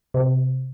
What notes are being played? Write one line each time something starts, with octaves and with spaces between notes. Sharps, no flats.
C3